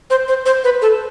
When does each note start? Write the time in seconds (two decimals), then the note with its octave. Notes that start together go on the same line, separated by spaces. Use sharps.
0.10 C5
0.28 C5
0.46 C5
0.64 B4
0.82 A4